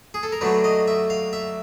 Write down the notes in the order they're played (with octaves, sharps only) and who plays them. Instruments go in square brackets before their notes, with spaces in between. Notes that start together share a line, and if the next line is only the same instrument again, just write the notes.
[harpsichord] G#4
A4
A#4
D3 F#3 A3 D4 B4
D#5
E5
F5
E5